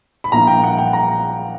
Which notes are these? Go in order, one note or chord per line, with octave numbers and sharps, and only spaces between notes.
B5
A#1 A#2 A#3 E4 A#5
G5
F#5
G5
A#5